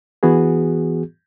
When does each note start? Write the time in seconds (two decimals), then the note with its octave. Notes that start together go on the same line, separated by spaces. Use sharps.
0.23 E3 B3 F#4 G#4